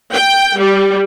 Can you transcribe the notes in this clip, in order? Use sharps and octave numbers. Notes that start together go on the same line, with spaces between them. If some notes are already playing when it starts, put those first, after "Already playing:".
G5
G3